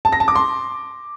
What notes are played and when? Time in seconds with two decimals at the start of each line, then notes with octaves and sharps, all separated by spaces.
0.05 A5
0.13 A#6
0.20 A5
0.28 D6
0.36 C6